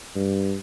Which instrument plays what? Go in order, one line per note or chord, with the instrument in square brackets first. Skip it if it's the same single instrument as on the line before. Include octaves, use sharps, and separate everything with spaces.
[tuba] G2